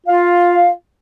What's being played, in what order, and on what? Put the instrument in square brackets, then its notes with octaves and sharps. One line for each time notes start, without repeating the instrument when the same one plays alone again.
[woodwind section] F4 F5